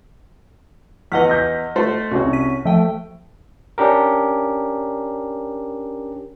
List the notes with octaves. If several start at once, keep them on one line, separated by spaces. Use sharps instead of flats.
E2 E3 D#5 F#5 F6 B6
G6 A#6
A3 C5
C2 C#4 F#4
B6 D#7
F3 A3 G5
C#4 D4 G4 A#4